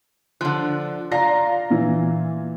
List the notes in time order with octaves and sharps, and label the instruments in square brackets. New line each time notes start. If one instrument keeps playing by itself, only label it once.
[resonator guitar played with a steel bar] D3 F3 [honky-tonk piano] F#6
[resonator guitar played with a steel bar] F4 [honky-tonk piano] D5 A#5 A#6
[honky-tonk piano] A#2 E3